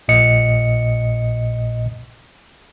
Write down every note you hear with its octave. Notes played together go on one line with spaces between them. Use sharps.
A#1 A#2 D#5 C#7